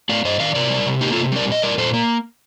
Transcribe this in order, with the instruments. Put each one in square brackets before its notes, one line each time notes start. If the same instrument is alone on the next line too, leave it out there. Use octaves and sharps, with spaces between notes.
[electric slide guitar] A3 D5 F5
G2 C5 D#5
D#3 D5 F5
C3 A#4 D5
G3
C3
A#3 D#4 G4
F4 A4
C3
G3 A#4 D5
A#2 D#5
G3 A#4 D5
A#2 A4 C5
A#3